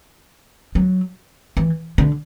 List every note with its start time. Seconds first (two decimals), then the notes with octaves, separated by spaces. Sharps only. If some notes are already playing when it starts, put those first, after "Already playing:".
0.75 F#3
1.57 E3
1.98 D3